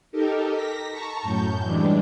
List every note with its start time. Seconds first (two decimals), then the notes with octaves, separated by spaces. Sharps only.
0.12 D#4 G4 A4 A#4
0.53 A#6 B6
0.91 A5 A#5 C#6
1.23 F#2 A2 G6
1.63 E3 G3 G#3 D4